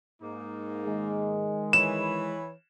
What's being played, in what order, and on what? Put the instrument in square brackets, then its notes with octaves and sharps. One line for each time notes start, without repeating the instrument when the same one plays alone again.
[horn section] G#2 A#3 D#4
[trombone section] D#3 G#3
[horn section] E3 C#5 B5 [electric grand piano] E7